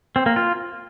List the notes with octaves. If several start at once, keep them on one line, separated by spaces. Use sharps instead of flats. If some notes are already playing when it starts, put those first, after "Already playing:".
C4
A#3
F4